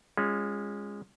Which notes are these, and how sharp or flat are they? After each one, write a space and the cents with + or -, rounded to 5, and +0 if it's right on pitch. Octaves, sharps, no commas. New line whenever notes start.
G#3 -20 C#4 +0 F4 +0